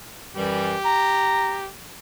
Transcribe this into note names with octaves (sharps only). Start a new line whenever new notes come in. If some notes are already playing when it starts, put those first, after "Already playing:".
F#2 E3 G3 G4
A#5